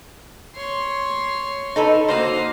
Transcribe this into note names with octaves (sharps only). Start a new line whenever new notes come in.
C#5 C6
D#4 A4 B4
A#3 F#4 C5 D#5 F5